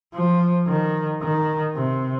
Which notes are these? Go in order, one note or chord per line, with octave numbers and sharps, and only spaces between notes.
F3
D#3
D#3
C3